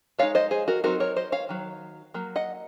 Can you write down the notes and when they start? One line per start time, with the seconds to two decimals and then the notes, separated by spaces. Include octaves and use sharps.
0.19 G#3 D#4 C#5 F5
0.35 C5 D#5
0.51 G#4 C5
0.68 F#4 A#4
0.84 F#3 C4 D#4 F#4 A#4
1.00 A#4 C#5
1.16 C5 D#5
1.32 C#5 F5
1.49 D#3 F#3
2.14 F#3 A#3
2.36 D#5 F#5